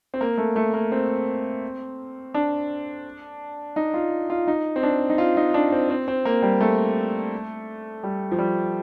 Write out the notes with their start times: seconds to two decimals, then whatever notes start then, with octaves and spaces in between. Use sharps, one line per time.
0.14 C4
0.21 A#3
0.38 A3
0.56 A3
0.74 A#3
0.92 C4
2.34 D4
3.76 D#4
3.94 F4
4.30 F4
4.47 D#4
4.76 C4
4.83 D4
5.10 D#4
5.18 F4
5.37 D#4
5.54 D4
5.72 C4
5.90 C4
6.08 C4
6.25 A#3
6.42 G3
6.60 A3
8.03 G3
8.31 F3
8.38 G3